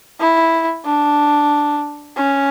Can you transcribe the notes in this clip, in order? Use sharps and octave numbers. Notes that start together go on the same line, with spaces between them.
E4
D4
C#4